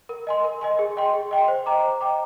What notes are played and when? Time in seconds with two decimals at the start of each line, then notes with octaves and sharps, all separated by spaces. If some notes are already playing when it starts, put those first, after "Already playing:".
0.09 A#4
0.27 D#5 G#5 C6
0.44 A#4
0.61 D#5 G#5 C6
0.79 G#4
0.97 D#5 G5 C6
1.14 G#4
1.31 D#5 G5 C6
1.48 C5
1.66 D#5 G5 A#5 D6
1.83 C5
2.01 D#5 G5 A#5 D6